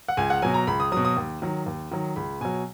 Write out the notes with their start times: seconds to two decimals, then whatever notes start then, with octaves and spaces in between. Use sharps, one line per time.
0.08 F#5
0.17 C#2 G#5
0.30 F#5
0.42 B2 F#3 G#5
0.54 A#5
0.67 C#2 B5
0.80 D#6
0.92 F#3 D#6
0.97 B2
1.05 D#6
1.17 D#2
1.42 D#3 F#3
1.66 D#2
1.92 D#3 F#3
2.16 C#2 B5
2.41 B2 F#3 G#5